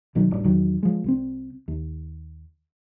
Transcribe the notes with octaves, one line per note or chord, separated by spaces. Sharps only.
B1 B2 D#3 F#3
D1 G#1 G2
E1 E2 D#3 F#3
F3 G#3
C2 G3 C4
D#2